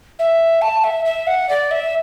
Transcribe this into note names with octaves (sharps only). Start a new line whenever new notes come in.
E5
A5
E5
E5
F#5
D5
E5